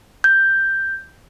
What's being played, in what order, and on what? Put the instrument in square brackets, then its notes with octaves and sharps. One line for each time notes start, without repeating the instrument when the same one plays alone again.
[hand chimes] G6